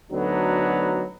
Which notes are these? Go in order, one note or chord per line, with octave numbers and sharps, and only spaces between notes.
D2 D3 F#3 B3 D#4